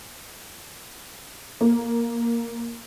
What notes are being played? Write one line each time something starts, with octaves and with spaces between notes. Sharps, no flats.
A#3